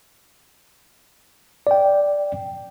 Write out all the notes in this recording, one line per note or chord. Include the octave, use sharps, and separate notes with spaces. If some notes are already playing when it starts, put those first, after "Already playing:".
D5 G5